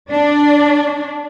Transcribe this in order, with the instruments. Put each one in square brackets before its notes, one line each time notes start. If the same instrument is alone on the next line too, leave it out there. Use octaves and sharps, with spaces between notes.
[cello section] D4